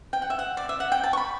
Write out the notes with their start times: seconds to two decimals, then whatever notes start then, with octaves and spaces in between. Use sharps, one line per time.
0.13 G5
0.22 F#5
0.30 E5
0.39 F#5
0.57 D5
0.69 E5
0.80 F#5
0.92 G5
1.03 A5
1.13 C#6
1.17 B5